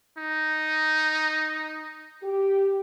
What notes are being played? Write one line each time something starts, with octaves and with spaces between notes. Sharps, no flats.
D#4
G4